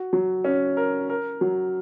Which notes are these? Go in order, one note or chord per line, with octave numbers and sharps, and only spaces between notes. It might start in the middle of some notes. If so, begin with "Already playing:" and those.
Already playing: F#4
F#3
C#4
A#4
A#4
F#3